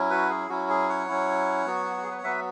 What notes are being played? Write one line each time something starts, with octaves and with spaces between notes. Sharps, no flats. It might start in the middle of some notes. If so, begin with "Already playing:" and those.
Already playing: F#3 C#4 E4
F#4 B4
G#4
F#3 C#4 E4 F#4
G#4
C#5 F#5
F#3 C#4 E4
F#3 B3 F#4
F#4
G#4
B4
C#5
F#3 B3 F#4 B4 E5